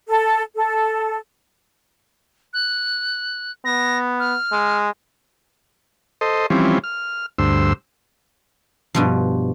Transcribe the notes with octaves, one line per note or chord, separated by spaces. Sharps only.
A4
A4
F#6
B3 A#6
F6
G#3
A4 C5 D#5
E3 F3 G3 C4 C#4
F6
D2 G2 C5 E6
G2 B2 F3